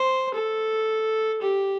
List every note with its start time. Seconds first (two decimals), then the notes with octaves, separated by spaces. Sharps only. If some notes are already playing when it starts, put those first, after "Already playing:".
Already playing: C5
0.34 A4
1.42 G4